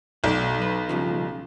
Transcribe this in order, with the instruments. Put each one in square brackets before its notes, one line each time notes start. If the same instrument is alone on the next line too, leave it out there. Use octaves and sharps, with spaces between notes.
[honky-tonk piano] B1 [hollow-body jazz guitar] F#3 D5
[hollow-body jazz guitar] B4
G2 C#3 F3